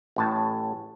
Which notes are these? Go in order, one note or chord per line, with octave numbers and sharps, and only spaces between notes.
A1 A2 A5